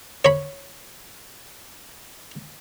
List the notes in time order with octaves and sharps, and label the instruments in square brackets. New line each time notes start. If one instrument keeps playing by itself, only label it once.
[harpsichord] C#5 B5